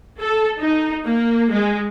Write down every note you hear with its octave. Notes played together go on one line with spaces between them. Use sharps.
A4
D#4
A#3
G#3